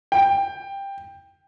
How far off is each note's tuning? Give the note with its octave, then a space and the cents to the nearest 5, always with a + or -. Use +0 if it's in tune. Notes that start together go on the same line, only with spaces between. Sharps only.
G5 +10